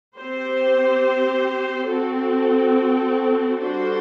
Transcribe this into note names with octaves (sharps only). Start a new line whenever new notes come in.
C4 G4 C5
C4 F#4 A4
G3 D4 F#4 A4 C5